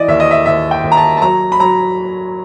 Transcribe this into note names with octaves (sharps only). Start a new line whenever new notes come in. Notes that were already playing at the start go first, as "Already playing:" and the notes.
Already playing: E3 D5 D#5
D#2 E5
D#5
E5
D#2 E5
G5
D#2
A#5
A5
A5
F#3 A#5
B5
F#3 A#5